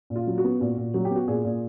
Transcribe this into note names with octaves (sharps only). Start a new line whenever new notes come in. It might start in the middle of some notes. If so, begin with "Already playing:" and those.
A#2
F4
F#3
F#4
B3
A#2 F#4
A#2
F#3 F#4
G4
B3
F#4
A#2 G#4
A#2